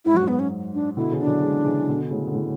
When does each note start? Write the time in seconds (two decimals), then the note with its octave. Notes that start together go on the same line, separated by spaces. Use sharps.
0.05 G#2 E4
0.14 F#2 F#4
0.23 G#2
0.28 B3
0.39 C#4
0.74 D4
0.97 B2 D3 E4
1.12 C#3 E3
1.20 D4
1.27 D3 F#3
1.42 E3 G#3
1.65 C#3 E3
1.80 E3
1.89 B2 D3
2.11 A2 C#3
2.27 D3
2.34 A2 C#3